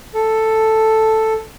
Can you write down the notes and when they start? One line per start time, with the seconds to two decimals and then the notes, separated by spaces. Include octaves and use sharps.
0.14 A4